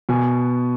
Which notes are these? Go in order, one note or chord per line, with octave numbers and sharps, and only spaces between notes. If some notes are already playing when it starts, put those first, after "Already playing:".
B2 G#5